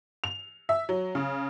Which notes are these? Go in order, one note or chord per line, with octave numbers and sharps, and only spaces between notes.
F7
E5
F#3
C#3